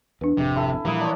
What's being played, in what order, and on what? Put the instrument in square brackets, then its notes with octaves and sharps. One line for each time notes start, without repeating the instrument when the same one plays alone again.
[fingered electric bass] E2 [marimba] D4 B4
[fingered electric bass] G#1 F2 [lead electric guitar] C3
[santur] E4 A4 G#5
[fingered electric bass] A#2 F3 G3 [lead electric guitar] E3 [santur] A#3 D#6
[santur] D4 C5 C#5